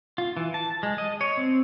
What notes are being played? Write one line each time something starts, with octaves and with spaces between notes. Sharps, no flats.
F4
E3
A5
G#3
D#5
C#5
C4